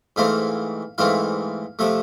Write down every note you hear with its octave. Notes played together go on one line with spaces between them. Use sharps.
G#2 E3 A3 C4 F5
G#2 E3 A3 C4 F5
C3 F3 A3 E5